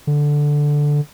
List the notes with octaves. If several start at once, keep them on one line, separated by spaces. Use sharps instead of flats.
D3